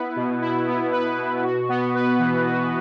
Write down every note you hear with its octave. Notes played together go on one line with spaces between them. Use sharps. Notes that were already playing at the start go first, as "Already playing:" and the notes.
Already playing: B3 E4 B4
B2
E4
B3
B4
B2
F#4
B3
B4
E3
F#4